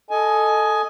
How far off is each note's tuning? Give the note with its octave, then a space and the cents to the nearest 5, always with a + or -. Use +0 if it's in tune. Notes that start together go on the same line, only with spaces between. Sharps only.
A4 +0 D#5 +0 G#5 +15